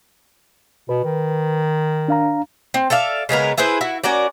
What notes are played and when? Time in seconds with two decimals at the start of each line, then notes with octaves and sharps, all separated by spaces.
0.89 B2 B4
1.05 D#3
2.08 D4 F5 A#5
2.74 C4
2.90 A4 D5 E5 F5
3.29 C#3 G#3 B3 A#4
3.58 E4 G#4 B4 C5
3.81 E4 F#4
4.04 C#4 F#4 A#4 D5